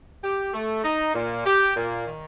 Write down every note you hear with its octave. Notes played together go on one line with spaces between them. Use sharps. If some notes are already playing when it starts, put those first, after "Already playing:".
G4
A3
D#4
A#2
G4
A#2
D#3